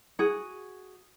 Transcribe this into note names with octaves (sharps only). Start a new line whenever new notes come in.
F#4 G#4